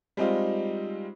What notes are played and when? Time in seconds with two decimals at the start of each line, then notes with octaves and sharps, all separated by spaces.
0.17 G3 G#3 C4 D#4 F4